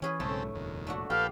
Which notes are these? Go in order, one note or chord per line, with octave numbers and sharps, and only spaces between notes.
E3 C#4 G#4 B4
B1 G#2 C#3 A3 C4 A4
F1 D#2 A#2
A3 D4 F#4
A#1 G4 A4 B4 F5 G5